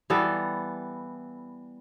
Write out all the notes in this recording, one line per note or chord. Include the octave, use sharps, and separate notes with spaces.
E3 G3 B3 A4